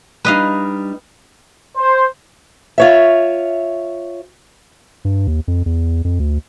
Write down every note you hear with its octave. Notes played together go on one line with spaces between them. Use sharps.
G3 D4 D#4 B4 D#5 F5
C5
F4 C#5 E5
G2
D#2
F2
E2
F2
D2